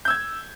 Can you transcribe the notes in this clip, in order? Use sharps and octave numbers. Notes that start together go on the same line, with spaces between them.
E6 G6 G#6